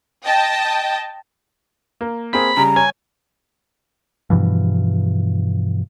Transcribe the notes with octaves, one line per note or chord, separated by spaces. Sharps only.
D#5 G5 A5
A#3
A#3 C4 G#4 B5
C#3 G3 A#5
C#5 G#5
G2 B2 E3 F3